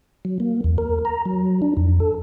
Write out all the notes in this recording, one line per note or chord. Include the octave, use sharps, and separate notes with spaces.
F#3
A#3
E2
A#4
A#5
F#3
D4
F2
A4